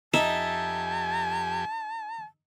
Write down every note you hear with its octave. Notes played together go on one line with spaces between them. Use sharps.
F2 D#4 G4 E5 G#5 A5